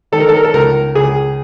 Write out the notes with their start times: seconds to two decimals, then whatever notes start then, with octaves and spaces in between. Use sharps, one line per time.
0.12 D#3 A4
0.20 A#4
0.29 A4
0.36 A#4
0.44 A4
0.53 C#2 A#4
0.95 C#2 G#4